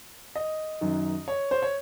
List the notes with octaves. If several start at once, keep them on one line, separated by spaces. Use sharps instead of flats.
D#5
F#2 D#3
C#5
C5
C#5